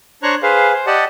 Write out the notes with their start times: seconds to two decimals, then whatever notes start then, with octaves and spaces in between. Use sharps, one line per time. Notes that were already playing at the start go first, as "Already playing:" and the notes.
0.23 D4 C5 C#5 A#5 C#6 F#6
0.43 G#4 B4 C5 F5
0.73 C5
0.87 G4 D5 D#5 F#5 A5